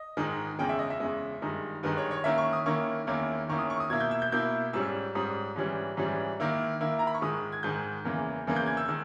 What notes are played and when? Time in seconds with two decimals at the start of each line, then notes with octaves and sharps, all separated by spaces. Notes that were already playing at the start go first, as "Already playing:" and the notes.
Already playing: D#5
0.17 G#2 D#3 G#3 D#4
0.59 E2 C#3 G#3 G5
0.69 E5
0.79 D#5
0.90 E5
1.00 E2 C#3 G#3
1.42 G2 D#3 G#3 D#4
1.83 G2 D#3 G#3 D#4 B4
1.97 C#5
2.11 C#5
2.24 D#3 A#3 C#4 E4 E5
2.38 C#6
2.53 D#6
2.66 D#3 A#3 C#4 E4 C#6
3.07 E2 D#3 A#3 C#4 E4
3.49 E2 D#3 A#3 C#4 E4 C#6
3.59 D#6
3.70 C#6
3.80 D#6
3.90 B2 A#3 E4 G#6
4.00 G6
4.11 E6
4.22 G6
4.32 B2 A#3 E4 G6
4.73 G#2 G3 C#4 E6
5.15 G#2 G3 C#4 D#6
5.56 G#2 E3 G3 C#4
5.97 G#2 E3 G3 C#4
6.40 D#3 A#3 E4
6.81 D#3 A#3 E4
6.99 A#5
7.07 B5
7.14 C#6
7.22 G#2 D#3 G#3 D#6
7.52 G#6
7.63 G#2 D#3 G#3 G6
8.05 E2 C#3 E3 A#3
8.47 E2 C#3 E3 A#3
8.56 G6
8.67 G#6
8.77 E6
8.88 D#3 G#3 E6